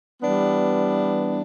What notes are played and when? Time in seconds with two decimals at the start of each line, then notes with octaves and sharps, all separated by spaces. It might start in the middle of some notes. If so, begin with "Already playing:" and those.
0.21 E3 G3 B3 D4